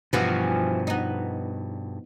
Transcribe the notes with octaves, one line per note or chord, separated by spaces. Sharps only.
G2 B2 E3 F3 F#4
B3 D#4